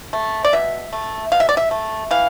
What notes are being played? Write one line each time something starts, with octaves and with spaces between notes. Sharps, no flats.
A3
D5
B2 E5
A3
B2 F5
E5
D5
E5
A3
E3 F5